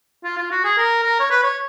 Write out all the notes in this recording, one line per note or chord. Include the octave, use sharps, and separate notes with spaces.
F4
F4
F#4
G#4
A#4
A#4
C#5
B4
C#5